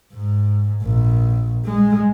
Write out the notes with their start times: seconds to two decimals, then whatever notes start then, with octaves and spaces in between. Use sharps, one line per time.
0.13 G#2
0.83 A#1
1.65 G#3